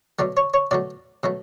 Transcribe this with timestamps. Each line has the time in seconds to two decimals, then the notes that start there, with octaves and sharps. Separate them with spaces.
0.19 B2 F#3 A3 D5
0.37 C#5
0.54 C#5
0.71 B2 F#3 A3 D5
1.23 B2 F#3 A3